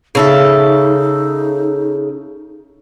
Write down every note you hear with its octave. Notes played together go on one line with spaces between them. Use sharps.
C#3 D#4 A4 E5